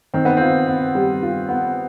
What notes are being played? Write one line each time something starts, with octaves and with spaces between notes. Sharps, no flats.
D#3 C4
B3
C4 F4
B3
G3
F4
B3